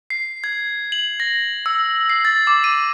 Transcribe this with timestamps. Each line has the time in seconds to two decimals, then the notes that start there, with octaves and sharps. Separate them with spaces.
0.10 C7
0.44 G#6
0.92 F#7
1.20 A#6
1.66 E6
2.10 C7
2.25 A6
2.47 D6
2.64 D#7